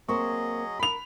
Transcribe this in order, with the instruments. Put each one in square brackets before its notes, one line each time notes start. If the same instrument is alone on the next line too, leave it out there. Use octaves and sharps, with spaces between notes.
[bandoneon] F#3 G#4 D#5 [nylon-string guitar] A#3 C4 C5 [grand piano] C#6
[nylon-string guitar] A#4 [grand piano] B5 F7